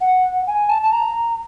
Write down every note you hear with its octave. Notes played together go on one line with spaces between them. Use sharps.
F#5
G#5
A5
A5
A#5